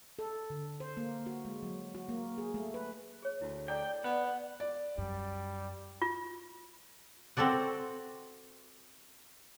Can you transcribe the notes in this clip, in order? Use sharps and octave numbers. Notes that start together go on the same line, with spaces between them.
A4
D3
C5
A#3
F#4
G#3
F#3
F#4
A#3
G#4
A3
B4
G#4 C#5
D2 E4
A4 D5 G5 A#5 D6
B3 F#5
D5
F#2 G3
F4
C4 F#4 A4 D5 F#5